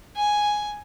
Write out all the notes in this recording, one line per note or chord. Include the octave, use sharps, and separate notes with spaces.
G#5